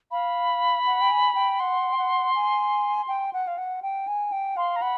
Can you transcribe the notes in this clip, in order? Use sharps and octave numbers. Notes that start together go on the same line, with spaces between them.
F5 B5
F#5
G5
G#5
G5
F#5 C6
G5
F#5
G#5
G5
F#5
F5
F#5
G5
G#5
G5
F5 C6
A#5
F#5 B5